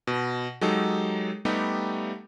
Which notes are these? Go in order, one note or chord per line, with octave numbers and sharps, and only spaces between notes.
B2
F#3 G#3 D#4 G4 A4
G3 A3 B3 D#4 G4